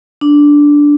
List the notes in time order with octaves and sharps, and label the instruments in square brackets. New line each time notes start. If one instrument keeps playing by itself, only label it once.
[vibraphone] D4